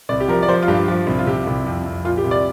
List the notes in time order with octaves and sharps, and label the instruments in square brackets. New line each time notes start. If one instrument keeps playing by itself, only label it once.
[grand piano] C2 D5
G4
F3 A#4
D5
F3 C5
F4
G2 G4
F3
C2
F4
C3 G4
C2
F2
F2
A#2 F4
G4
C2
D5